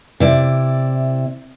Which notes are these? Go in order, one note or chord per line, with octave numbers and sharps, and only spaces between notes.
C3 E4 D5